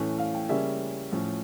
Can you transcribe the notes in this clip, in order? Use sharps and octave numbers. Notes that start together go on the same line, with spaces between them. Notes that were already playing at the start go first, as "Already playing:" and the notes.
Already playing: A2 E3 A3 C#4
F5
G5
C#3 G3 A#3 C#4 E5
A2 F3 C#4